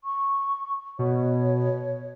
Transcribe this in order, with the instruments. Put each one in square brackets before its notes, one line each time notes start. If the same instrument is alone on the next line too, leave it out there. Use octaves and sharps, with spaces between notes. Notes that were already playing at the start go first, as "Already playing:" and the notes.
[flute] C#6
[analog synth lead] B2 [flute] C#5